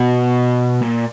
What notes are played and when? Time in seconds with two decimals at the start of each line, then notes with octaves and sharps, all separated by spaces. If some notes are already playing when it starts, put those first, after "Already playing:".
Already playing: B2
0.82 A#2